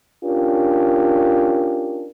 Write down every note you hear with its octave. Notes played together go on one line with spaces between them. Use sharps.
C#4 D4 F4 G4 A#4